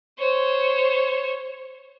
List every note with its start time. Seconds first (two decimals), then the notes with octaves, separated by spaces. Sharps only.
0.19 C5 C#5